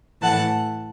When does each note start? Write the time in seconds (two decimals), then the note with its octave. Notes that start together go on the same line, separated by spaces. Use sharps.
0.21 A2 E3 A3 F#5 A5